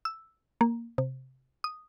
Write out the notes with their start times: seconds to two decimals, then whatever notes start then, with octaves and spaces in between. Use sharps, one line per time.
0.05 E6
0.61 A#3
0.98 C3
1.64 D#6